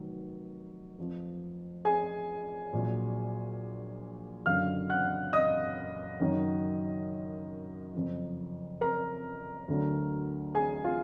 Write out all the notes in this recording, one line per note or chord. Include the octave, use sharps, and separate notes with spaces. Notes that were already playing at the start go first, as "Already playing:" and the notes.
Already playing: F1 D#3 F#3
F2 F3
G#4 G#5
A#1 A#2 F#3
F#1 F#2 D3 F#3 F5 F6
F#5 F#6
D#5 D#6
F#1 F#2 D#3 F#3
F#1 F2 F3
A#4 A#5
D2 D3 F#3
G#4 G#5
F4 F5